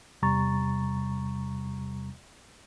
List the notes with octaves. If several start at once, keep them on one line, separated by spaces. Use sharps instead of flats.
E2 C3 G3 A#5 C#6 A6